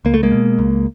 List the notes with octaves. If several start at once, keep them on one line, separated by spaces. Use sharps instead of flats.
C#2 A#3
A3
G#3 A#3
B2
C#2